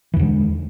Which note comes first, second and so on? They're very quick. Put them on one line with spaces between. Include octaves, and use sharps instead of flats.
E3 E2 D3 G#3